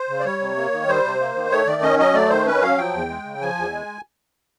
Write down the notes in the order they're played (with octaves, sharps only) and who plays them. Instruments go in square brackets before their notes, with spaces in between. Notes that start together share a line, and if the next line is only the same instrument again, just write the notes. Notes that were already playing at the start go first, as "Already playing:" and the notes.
Already playing: [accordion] C5
C#3
D5
G3 C#5
C3
A#3
D#3
G3 C5
C3
A#3
D#3
A3 C#5
D#3 D5
C#4 D#5
F#3 D#5
A3 D5
D#3 C5
C#4 B4
F#3 F5
F3 G5
E2
G#3
C#3
F3 G#5
E2
G#3